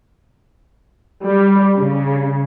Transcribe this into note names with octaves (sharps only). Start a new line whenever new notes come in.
G3
C#3